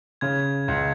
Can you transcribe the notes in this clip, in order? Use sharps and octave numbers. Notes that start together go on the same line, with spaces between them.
C#3 G#6
C#2